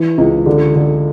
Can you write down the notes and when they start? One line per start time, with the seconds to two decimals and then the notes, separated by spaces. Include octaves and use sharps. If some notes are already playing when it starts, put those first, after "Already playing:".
Already playing: E3
0.18 C#2
0.46 D3
0.75 D3